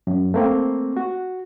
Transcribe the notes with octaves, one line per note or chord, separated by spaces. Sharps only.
F#2
A3 A#3 C4
F#4